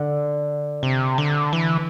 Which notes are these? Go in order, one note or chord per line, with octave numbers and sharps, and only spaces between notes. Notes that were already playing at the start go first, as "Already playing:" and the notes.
Already playing: D3
C3
D3
E3